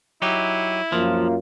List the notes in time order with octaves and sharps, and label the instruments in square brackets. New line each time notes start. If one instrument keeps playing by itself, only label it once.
[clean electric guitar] F#3 D#4 G4 [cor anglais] E4
[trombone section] F#2 A#3 F4 [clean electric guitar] F3